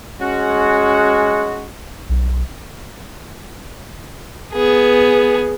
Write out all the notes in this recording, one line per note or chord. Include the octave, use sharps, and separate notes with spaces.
G#3 C#4 F#4
B1
B3 G#4